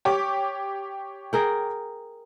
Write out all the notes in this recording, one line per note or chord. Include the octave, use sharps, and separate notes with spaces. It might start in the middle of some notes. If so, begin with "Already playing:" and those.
G4 C#5 D6
G#4 A#4 G5